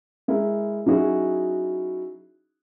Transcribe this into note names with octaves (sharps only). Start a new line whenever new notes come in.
G#3 E4 A#4
F#3 C#4 D#4 E4 F#4 G#4